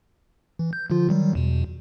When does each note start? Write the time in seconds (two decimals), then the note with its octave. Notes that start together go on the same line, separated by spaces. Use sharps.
0.59 E3
0.73 G6
0.90 D3 F3 F4
1.09 D#3 F#3 G3
1.35 E2 B2